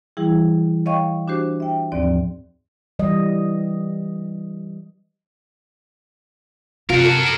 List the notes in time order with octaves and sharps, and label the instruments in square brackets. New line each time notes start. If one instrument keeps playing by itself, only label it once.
[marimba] E3 G3 E4 G#4
C#5 D#5 F5 G5 C#6
D4 F#4 G4 C5
E5 G5
D#2 G#2 F3 C4 D5
[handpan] E3 G3 D#5
[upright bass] C3 [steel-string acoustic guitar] F4 [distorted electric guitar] F#4 A#4
[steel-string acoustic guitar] A4